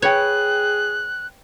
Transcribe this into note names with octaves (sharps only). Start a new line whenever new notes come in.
G#4 B4 C#5 G5 F#6